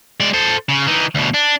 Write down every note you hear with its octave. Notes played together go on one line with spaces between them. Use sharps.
G#3 D5
A4 C5
C#3
E3 D#4
D2 B2
D4